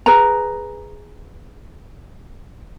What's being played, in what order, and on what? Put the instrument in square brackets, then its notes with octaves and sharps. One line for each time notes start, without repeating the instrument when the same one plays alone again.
[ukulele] G#4 B4 A#5